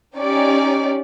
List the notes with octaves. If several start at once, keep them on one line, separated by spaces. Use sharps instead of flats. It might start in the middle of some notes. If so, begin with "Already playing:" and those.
C#4 D#4 G4 D5